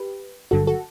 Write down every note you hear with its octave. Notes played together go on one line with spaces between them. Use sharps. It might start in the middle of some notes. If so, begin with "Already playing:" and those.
Already playing: G4 B4
G1 G2 D3 F#3 F#4 A4
F#4 A4